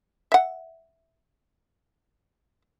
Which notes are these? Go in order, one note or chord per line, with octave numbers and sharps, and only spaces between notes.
E5 F#5